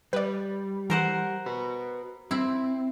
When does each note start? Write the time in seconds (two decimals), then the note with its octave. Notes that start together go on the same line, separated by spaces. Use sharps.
0.13 G3 B4 D5
0.90 E3 A#4 C5 F#5
1.46 F#4 B4
2.31 G2 C4 E4 B5 E6